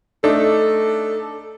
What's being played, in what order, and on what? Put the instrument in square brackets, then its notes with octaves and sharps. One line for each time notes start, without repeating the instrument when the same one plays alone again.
[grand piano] A3 D4 D#4 [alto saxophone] A4